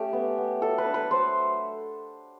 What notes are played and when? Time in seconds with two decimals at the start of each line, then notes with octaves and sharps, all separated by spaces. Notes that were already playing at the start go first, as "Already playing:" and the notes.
Already playing: A3 C#4 G4
0.13 B3
0.38 B3
0.62 F#3 A4
0.78 B4
0.86 D4
0.94 B4
1.11 F#3 C5